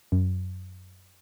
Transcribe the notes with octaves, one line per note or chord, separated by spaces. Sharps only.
F#2